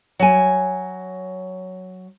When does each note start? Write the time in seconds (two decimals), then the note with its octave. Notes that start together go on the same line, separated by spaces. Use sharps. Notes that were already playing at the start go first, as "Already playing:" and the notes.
0.19 F#3 G#5